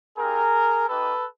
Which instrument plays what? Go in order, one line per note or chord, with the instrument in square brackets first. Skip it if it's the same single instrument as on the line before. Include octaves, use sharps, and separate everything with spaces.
[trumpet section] C4 E4 G4 G#4 A#4
A#3 D#4 G4 A4 B4